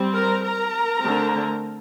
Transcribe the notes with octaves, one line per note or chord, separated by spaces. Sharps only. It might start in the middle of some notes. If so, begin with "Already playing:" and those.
Already playing: G3 C4
A#4 A#5
A#4 A#5
D3 A3 C4